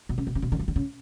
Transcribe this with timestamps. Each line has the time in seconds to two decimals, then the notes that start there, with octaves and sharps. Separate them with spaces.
0.09 B2
0.18 C#3
0.27 B2
0.35 C#3
0.42 B2
0.52 D3
0.59 F3
0.68 D3
0.76 C#3